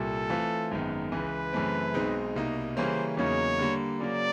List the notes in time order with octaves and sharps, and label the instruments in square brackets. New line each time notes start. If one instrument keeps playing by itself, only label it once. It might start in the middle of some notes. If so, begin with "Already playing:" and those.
Already playing: [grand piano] C2 A#2 G3 [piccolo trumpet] A4
[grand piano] E3 A3 C4 F4
G#1 F#2 D#3 G#3 B3
[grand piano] C#2 C#3 E3 [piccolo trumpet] B4
[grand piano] F#2 C#3 E3 A3 C4
B1 B2 G#3 C4 D#4
C2 B2 G3 A#3 D#4
[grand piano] C#3 E3 G3 A#3 C#4 [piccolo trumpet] C5
[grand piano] E2 C#3 F#3 A#3 D#4 [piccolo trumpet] C#5
[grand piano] D3 G3 A#3
[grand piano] C#3 F#3 A#3 [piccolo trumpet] D5